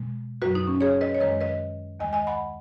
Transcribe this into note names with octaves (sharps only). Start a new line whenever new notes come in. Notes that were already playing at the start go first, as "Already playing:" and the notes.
Already playing: B2 G#3
F#2 F#3 F#4 B4
D#4
C#4
G#4 C#5
B4 D#5
C#5
F#2 D#3 G#3 B4 D#5
B4 D#5
D#2 D#3 G#3 D#5 G#5
D#5 G#5
F#5 B5